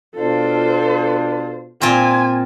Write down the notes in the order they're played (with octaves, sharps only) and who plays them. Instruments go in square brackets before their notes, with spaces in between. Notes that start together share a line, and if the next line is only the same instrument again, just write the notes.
[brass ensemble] B2 D4 F4 [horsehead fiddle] A4 C5
[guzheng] A#2 C4 F4 [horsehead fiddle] G#5